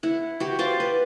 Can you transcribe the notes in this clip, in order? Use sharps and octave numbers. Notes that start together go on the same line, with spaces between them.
E4 F#5
F#4 G4
F4 G4 C5 D5
B4